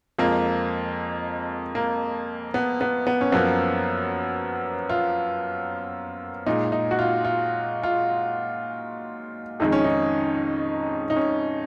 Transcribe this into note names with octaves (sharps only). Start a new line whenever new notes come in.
F2 F3 G#3 A#3
A#3
B3
B3
B3
C#4
F#2 F3 A#3 B3
F4
A#2 G#3 D#4
D#4
F#4
F4
F4
F4
F2 D#3 G#3 D#4
C#4
D#4
D#4
C#4